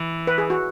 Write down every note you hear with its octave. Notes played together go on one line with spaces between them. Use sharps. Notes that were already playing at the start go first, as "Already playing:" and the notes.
Already playing: E3
B4
G#4
F#4